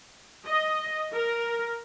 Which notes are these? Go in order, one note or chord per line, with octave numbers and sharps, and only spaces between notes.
D#5
A#4